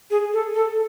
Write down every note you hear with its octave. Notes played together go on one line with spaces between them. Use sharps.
G#4
A4
A4